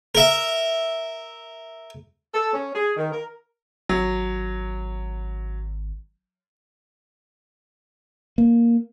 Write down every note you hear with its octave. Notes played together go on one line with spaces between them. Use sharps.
A#4 E5
A4
C#4
G#4
D#3
A#4
G#1 F#3
A#3